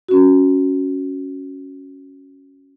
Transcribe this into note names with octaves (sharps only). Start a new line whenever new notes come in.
C#4 F#4